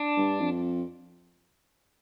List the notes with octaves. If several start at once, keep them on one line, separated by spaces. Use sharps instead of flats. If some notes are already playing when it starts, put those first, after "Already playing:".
Already playing: D4
G2
F2